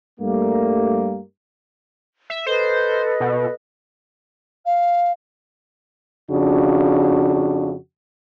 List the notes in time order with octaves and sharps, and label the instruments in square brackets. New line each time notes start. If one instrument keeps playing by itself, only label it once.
[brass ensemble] G2 G3 A3 A#3
[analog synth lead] E5
[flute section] A4 B4 D#5 [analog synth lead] C5
[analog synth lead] B2
[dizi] F5
[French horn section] F2 C#3 D4 F#4